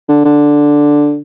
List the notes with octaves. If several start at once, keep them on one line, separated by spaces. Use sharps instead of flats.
D3
D3